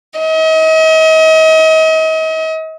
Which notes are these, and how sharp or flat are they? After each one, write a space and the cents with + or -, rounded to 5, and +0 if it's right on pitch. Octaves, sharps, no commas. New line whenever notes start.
D#5 +40